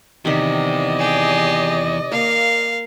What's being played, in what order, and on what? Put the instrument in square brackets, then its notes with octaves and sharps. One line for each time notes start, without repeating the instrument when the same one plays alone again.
[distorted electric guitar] E2 [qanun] C3 D#3 [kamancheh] D5 D#5
[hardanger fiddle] G4 G#4
[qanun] A#3 [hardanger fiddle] A#4 F5